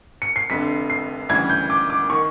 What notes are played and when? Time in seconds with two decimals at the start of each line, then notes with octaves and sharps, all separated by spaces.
0.22 C#7
0.36 C7
0.49 F1 F2 D3 B6
0.90 C7
1.29 D2 C#3 E3 G3 G#6
1.50 G6
1.70 D6
1.90 D6
2.10 D#3 C#6